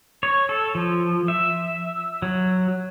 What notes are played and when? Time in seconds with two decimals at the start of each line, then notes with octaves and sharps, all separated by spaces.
0.23 C#5
0.49 A4
0.75 F3
1.28 E5
2.22 F#3